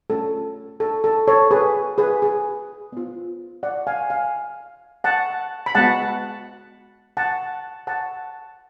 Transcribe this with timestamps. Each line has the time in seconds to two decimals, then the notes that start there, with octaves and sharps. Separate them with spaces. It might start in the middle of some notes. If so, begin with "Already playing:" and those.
0.10 A3 C#4 F4 A4
0.80 A4
1.04 A4
1.27 A4 C#5
1.51 G#4 B4
1.98 G#4 B4
2.22 G#4
2.92 B3 F4
3.63 D5 F#5
3.87 F5 G#5
4.10 F5 G#5
5.04 F#5 A5
5.66 B5
5.75 G#3 B3 F#4 F#5 A5
7.17 F#5 A5
7.87 F#5 A5